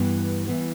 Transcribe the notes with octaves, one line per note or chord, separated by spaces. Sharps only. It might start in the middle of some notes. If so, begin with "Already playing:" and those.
Already playing: G2 E3 B3
E3 B3